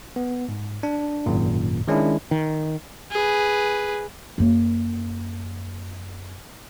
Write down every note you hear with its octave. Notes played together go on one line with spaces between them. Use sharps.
B3
G#2
D4
G#1 F#2 A#2
D#3 G#3 C#4 D4 E4
D#3
G#4 B4
F#2 A#3